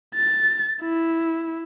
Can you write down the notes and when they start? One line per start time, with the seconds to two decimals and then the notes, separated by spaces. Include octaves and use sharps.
0.15 A6
0.81 E4